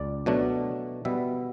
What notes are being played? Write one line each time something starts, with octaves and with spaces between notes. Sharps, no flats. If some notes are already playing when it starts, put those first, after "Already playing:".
Already playing: C#2 D5
B2 F#3 A3 D4
B2 G3 B3 E5